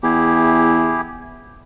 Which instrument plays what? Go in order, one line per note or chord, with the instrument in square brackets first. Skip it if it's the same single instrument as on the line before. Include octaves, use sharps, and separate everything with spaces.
[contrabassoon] E2 [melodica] E4 G4 G#4